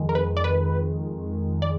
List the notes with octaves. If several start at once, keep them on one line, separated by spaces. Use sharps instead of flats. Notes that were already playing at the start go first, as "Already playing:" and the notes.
Already playing: F2 D#3 G#3
A#4
B4
D5
B4
D5